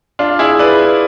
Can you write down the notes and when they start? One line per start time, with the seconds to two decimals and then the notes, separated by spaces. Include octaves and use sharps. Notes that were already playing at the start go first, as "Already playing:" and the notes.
0.19 D4 F4
0.39 E4 G#4
0.59 B4 D5